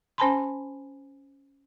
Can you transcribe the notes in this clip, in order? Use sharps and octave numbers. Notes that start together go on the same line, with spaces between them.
C#4 C5 G#5 A5 B5 C6